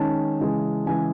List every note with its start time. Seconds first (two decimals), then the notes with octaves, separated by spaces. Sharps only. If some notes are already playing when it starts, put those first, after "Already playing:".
Already playing: D#3 G#3 C#4 A5
0.40 C#3 E3 G#3
0.86 C#3 E3 G#3 G#5